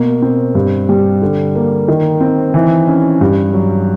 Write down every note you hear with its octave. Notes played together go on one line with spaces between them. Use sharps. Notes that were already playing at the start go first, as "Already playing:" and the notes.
Already playing: B2 A#3
C4
G2
G3
D3
A#3
D#3
C4
E3
C#4
G2
F#3